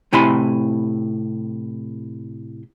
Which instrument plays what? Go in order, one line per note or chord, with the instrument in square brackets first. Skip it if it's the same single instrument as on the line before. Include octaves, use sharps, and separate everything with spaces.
[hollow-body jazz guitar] A2 C3 E4 G#5 B5 C6